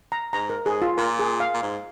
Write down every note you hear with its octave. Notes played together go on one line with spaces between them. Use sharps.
A#5
G#2 A#5
A#4
G#2 G#4
F4
A#2 A#4
G#4
F5
A#2
G#2